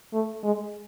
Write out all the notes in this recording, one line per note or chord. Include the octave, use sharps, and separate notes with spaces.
A3
G#3